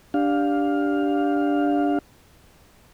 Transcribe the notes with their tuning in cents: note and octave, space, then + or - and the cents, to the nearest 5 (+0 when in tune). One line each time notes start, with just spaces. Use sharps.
D4 -10 G4 +0 F5 +10